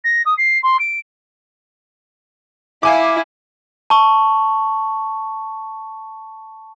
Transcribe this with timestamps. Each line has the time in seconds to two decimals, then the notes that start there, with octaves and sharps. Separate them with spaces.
0.04 A#6
0.25 D#6
0.38 C7
0.63 C6
0.79 D7
2.83 E4 F5 G#5 D6
3.90 A5 C#6